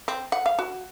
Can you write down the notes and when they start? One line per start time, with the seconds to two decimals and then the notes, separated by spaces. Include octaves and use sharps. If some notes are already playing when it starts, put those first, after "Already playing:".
0.08 C4
0.32 F#5
0.46 F5
0.59 F#4